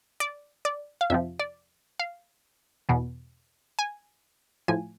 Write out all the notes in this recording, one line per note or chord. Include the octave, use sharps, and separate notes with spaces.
D5
D5
F5
F2 C3 F3 E5
D5
F5
E2 B2
G#5
A2 F3 G#5